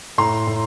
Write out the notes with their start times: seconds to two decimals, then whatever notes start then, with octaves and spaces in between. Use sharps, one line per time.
0.18 A2 A#5 C6
0.47 A2